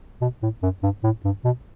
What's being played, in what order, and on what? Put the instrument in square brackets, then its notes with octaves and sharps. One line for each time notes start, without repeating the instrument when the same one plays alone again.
[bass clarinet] B2
A2
F#2
G2
A2
G2
B2